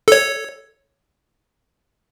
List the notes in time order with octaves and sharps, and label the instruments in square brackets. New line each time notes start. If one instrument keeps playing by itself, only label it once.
[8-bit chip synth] A4 C#5